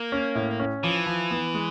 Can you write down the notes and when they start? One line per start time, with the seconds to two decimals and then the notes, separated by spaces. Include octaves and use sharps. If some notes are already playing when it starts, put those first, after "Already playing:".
Already playing: A#3
0.12 C#4
0.35 A2
0.59 C#4
0.83 E3 F3
1.07 F3
1.31 B3
1.54 G#3